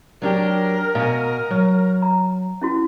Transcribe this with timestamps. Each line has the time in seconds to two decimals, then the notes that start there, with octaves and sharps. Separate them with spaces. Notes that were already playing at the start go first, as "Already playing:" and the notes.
0.22 F#3 D4 G4 A#4
0.95 B2 F5 G#5
1.51 F#3
2.02 A#5
2.62 C#4 E4 F#4